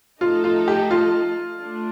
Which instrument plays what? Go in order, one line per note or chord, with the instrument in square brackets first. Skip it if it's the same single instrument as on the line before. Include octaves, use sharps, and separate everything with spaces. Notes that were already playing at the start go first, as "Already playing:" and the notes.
[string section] F3 A3 D#4 A4 D#5 [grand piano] F4
[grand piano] F4
G4
F4
[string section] A3 D4